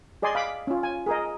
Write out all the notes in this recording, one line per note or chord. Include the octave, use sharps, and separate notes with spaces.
G#4 D5 D#5 G#5 C6
F5 B5 D6
C#4 F4
G#5
G#4 A#4 D#5